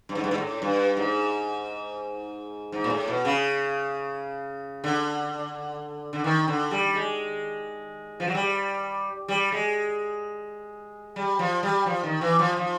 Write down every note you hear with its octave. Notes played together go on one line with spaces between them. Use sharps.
G2
G#2
G2
G#2
A2
G2
G#2
G#2
A#2
A2
B2
C#3
D3
D3
D#3
D3
G3
G#3
F3
F#3
G3
G3
G#3
G3
F3
G3
F3
D#3
E3
F3
F3